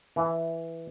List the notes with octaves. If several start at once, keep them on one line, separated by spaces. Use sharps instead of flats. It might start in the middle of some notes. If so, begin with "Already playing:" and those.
E3